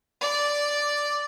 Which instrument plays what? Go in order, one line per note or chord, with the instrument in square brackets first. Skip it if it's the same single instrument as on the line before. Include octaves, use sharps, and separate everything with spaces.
[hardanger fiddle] D5